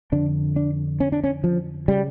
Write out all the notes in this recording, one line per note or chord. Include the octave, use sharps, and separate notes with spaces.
F2 D3 D4
D4
C#4
D4
C#4
F3
C#3 G3